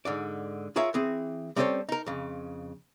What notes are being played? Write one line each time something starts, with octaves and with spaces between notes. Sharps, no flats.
G#2 D3 D5
F4 G#4 A#4 C#5 E5
E3 C4 G#4
G3 C4 C#4 A4 C5 C#5
D#4 A#4
F2 C#3